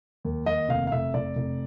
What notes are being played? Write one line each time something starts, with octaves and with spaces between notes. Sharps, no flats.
D#2
D#2 D#5
F1 F5
F5
F1 E5
F1 D5
F1